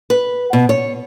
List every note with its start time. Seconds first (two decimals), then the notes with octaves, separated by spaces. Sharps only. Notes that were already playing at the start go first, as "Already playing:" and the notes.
0.10 B4
0.53 B2
0.69 C#5